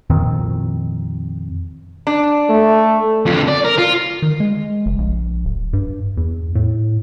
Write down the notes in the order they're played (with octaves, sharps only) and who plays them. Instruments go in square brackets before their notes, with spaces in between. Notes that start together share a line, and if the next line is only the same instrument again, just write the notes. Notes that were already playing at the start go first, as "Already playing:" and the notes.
[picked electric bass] F2 A#2 D#3 C4
[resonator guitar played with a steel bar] D4
[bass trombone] A3
[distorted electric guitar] F2 D3
D5
A#4
F4
[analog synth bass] D#3
G#3
F#1
A#1
D1
G2
E2
A2